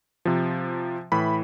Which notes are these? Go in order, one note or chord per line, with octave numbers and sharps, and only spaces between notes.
C3 F3
A2 E3 B5